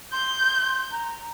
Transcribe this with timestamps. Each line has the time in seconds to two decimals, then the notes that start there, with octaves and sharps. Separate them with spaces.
0.12 C6 G6
0.91 A#5